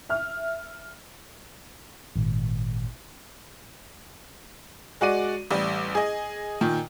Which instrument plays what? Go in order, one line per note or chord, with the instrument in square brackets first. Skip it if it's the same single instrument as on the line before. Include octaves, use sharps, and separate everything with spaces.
[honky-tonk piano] E5 F6
[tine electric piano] G#1 A#2
[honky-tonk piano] G#3 F#4 D5 D#7
A1 G3
G#4 D#5
A#2 D#3